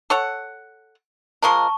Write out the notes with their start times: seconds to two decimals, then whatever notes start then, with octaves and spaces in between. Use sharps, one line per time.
0.10 A4 C#5 F#5
1.43 F3 G#3 A#4 A5 C#6